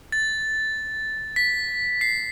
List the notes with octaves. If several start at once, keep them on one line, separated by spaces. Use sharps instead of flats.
A6
B6
C7